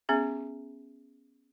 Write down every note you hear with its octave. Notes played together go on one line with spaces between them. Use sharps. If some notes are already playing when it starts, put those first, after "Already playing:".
B3 C#4 G#4 E5